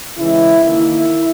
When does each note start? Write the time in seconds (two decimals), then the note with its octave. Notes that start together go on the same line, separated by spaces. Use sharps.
0.18 C#3 E3 G#3 E4
0.63 D#3 A#3 E4